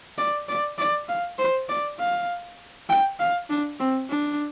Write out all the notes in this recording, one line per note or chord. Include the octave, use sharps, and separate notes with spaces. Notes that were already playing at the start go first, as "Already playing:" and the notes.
D5
D5
D5
F5
C5
D5
F5
G5
F5
D4
C4
D4